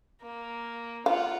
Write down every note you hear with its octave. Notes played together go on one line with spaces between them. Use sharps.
A#3
F4 F5 F#5